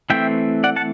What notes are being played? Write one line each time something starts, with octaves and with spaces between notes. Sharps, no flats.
E3 A3 C4 E5 G5
D5 F#5
F#5 A5